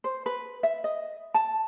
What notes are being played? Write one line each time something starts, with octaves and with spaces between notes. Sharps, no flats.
C5
B4
E5
D#5
A5